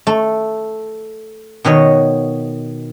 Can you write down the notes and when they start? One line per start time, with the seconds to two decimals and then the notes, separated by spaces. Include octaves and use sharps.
0.07 A3
1.65 B2 D#3 C#5 D#5